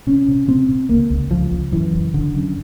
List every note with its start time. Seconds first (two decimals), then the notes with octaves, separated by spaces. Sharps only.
0.07 C3 C#4
0.28 C3
0.48 C3 C4
0.69 C3
0.89 C#2 A#3
1.10 C#2
1.31 C#2 F3
1.51 C#2
1.72 F#2 E3
1.93 F#1
2.14 F#1 D3
2.34 F#2